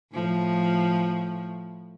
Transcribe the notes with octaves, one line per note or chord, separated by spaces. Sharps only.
A2 F3